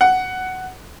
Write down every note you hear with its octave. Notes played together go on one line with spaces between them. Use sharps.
F#5